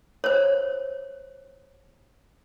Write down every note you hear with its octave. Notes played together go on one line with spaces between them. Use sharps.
C5 C#5